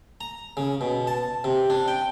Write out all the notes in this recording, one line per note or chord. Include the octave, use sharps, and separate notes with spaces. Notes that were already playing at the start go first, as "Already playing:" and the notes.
A#5
C#3
B2
A5
C3
D4
G5